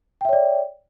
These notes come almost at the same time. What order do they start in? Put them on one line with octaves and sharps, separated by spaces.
G5 E5 C#5 D5